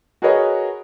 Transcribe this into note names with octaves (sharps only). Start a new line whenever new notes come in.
F#4 G#4 A#4 B4 C#5 D#5